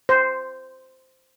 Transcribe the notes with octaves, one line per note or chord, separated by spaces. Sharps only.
C5